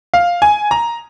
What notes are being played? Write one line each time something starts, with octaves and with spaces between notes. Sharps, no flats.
F5
G#5
A#5